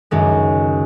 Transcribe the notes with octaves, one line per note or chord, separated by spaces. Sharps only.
C#2 F#2 D#3 G#3